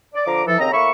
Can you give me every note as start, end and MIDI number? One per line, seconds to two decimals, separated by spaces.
0.14 0.22 74
0.25 0.42 50
0.25 0.42 53
0.25 0.42 82
0.25 0.42 86
0.47 0.57 52
0.47 0.57 53
0.47 0.57 69
0.58 0.68 39
0.58 0.68 49
0.58 0.68 60
0.58 0.68 75
0.58 0.68 82
0.72 0.90 45
0.72 0.90 58
0.72 0.90 76
0.72 0.90 83
0.72 0.90 85